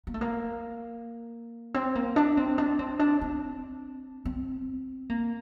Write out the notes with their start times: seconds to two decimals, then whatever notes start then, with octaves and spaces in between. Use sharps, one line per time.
0.07 A#3
0.14 A3
0.21 A#3
1.74 C4
1.95 A#3
2.16 D4
2.37 C4
2.58 D4
2.79 C4
2.99 D4
3.21 C4
4.25 C4
5.10 A#3